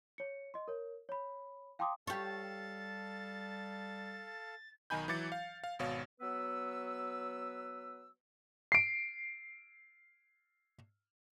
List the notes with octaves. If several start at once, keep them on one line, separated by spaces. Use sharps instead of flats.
C#5 C#7
D#5 C6
A#4 C#5
C#5 B5
F5 G5 A5 C6 D6 D#6
G3 G4 A4 C#5 F5 A5 A6
B1 D#3 D#4 G#5 B5 G6
E3 F#3 E4 D6 A6 C#7
F5
F5
G#1 B2 C#5 F5
F#3 B3 B4 E6
C7 D7